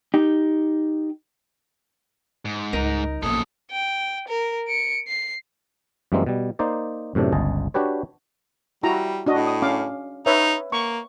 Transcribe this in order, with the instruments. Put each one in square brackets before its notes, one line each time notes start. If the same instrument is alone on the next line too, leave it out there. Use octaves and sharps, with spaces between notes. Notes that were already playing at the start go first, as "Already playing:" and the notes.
[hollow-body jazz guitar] D#4 G4
[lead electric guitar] G#2
[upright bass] C#2 G3 [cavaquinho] D#4 A#4
[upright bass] A#1 B2 [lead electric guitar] F#2 A4 [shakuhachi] D#6
[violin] G5
A#4
C#7 D7
C7
[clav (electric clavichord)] F#2 E3 G3 G#3 A#3 C4
B2 G3
A#3 D#4 C5 D5
F#2 A2 C3 D4
G1 C#2 D#5 G#5 A5
D4 F#4 G4 B4 C#5
[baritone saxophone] G3 [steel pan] E4 F#4 A#5
[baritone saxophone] A2 [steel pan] D4 F#4 D#5
[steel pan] D#6
C#4 F5 D6
[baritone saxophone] D#4 [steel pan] B4 C#5 E5
[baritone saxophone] A#3 [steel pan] C#6